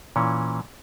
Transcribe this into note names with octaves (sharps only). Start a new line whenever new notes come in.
A#2 E3 C#4